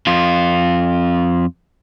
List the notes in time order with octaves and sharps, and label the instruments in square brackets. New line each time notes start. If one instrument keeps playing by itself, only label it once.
[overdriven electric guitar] F2 F4